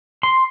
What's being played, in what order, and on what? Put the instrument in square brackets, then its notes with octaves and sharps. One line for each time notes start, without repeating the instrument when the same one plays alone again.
[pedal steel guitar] C6